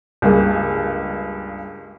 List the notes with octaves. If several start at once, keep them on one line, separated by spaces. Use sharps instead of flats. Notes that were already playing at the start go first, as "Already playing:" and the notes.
C#2 G2 A#3 G#4